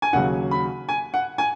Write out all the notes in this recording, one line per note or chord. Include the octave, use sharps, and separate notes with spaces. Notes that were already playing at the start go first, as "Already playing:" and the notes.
G#5
D#2 C#3 F#3 F#5
B5
G#5
F#5
G#5